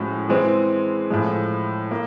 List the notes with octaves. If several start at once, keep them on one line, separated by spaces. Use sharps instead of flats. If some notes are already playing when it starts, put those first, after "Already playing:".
Already playing: A2 F3 G#3 C#4 F#4
E3 G#3 C4
A2 F3 G#3
A#3